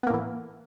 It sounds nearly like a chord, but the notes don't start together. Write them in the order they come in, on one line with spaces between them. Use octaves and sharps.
B3 A#3 A2 E3